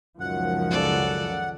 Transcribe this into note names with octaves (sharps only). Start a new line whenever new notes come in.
C#2 F#2 D#3 F3 F#5
C#3 A4 D5